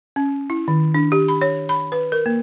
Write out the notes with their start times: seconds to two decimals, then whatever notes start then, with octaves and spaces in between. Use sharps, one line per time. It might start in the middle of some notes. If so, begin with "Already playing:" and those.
0.16 C#4
0.50 E4
0.68 D#3
0.94 D4
1.12 G4
1.28 B5
1.41 C#5
1.69 B5
1.92 B4
2.12 A#4
2.26 A#3